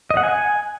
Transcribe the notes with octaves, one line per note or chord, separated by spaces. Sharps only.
D#5
F#5
G#5